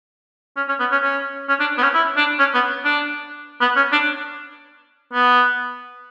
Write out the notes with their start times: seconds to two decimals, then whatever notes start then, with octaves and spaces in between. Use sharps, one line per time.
0.57 C#4
0.68 C#4
0.80 B3
0.91 C#4
1.03 C#4
1.49 C#4
1.60 D4
1.78 B3
1.83 C#4
1.94 E4
2.17 D4
2.39 C#4
2.54 B3
2.85 D4
3.61 B3
3.76 C#4
3.92 D4
5.13 B3